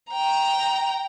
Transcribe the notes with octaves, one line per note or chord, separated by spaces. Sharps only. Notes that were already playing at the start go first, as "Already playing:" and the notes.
G5 A#5